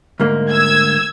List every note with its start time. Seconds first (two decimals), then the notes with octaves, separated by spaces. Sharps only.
0.20 D2 G#2 A#3
0.51 E6 G#6